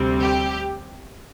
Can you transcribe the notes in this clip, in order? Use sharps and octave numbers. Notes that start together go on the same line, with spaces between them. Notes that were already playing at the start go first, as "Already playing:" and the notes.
Already playing: D2 C3 G3 C4
G4